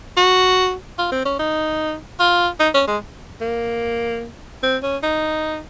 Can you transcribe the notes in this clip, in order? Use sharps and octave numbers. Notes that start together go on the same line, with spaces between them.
F#4
F4
C4
C#4
D#4
F4
D#4
C#4
G#3
A#3
C4
C#4
D#4